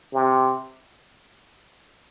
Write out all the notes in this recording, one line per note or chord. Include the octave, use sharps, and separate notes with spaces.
C3